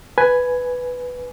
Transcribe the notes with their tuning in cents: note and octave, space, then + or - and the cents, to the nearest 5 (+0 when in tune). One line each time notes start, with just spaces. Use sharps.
B4 +5 G#5 +5